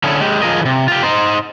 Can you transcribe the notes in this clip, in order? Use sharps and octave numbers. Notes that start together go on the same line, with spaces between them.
D3 C#4 E4 G#4 A4
G#3 G4
F3 F4 G#4 A#4 D#5
C3 E3
F4 G4
D#4 C5